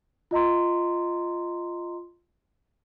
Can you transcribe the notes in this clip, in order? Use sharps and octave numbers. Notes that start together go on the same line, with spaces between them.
F4 D#5 A#5 C6